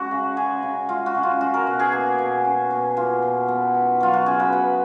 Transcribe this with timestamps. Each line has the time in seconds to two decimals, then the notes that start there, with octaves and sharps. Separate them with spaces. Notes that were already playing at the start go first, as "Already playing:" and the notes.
Already playing: G#3 C#4 F#4
0.11 C#3
0.37 C#4 G#4
0.63 C#3
0.89 G#3 F4
1.06 F#4
1.15 C#3
1.23 F4
1.41 C#4 F#4
1.54 A#4
1.67 B2
1.80 G#4
1.92 A#3
2.19 B2
2.45 C#4
2.70 B2
2.96 A#3 F4
3.22 B2
3.48 B3
3.75 D#4
4.00 F#3 F4
4.13 F#4
4.26 C#3 G#4
4.40 B4
4.53 B3